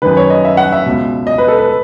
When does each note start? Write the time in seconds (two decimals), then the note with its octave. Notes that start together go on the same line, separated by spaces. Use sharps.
0.02 F#2 D#3 B4
0.17 C#5
0.30 D#5
0.45 E5
0.57 F#5
0.72 E5
0.86 C#2 B2
1.27 D#5
1.38 B4
1.48 A4
1.58 B4